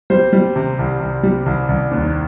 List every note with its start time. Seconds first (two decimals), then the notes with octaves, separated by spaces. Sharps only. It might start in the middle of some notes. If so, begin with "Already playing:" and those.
0.10 G3 C5
0.33 G3
0.56 C3
0.79 C2
1.00 C2
1.23 G3
1.46 C2
1.69 C2
1.91 D#2